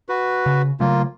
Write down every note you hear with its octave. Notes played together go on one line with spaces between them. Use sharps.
F#4 B4
C#3
C#3 F#3 A3 A#3 F4